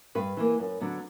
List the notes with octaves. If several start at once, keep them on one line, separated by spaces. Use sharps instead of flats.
G2 B4
E3 A#3
F#2
D3 F#3 B3